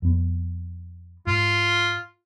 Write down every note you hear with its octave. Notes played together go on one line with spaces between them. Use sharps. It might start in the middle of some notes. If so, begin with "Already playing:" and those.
F2 B3
G#2 F4